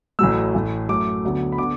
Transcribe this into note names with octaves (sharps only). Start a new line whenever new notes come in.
A1 A2 F#3 A3 E6
A1 A2 A3
F#2 F#3 A3 D6
D2 D3 F#3 B3
B5
D3 B3 D6